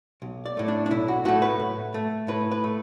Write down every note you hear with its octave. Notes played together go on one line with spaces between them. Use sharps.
B1
D5
A2 A3
D4
D4
B1 E4
F#4
A2 A3 F#4
B4
A2
A3
A2 B4
B4
A3